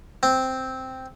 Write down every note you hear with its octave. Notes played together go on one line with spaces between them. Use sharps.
C4